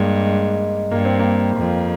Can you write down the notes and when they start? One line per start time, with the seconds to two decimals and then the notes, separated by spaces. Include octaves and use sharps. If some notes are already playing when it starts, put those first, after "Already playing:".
Already playing: G2 G#3 A#3
0.26 G#3
0.91 G2 A#3
1.05 C4
1.19 A#3
1.57 F2